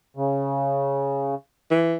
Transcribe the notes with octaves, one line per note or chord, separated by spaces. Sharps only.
C#3
E3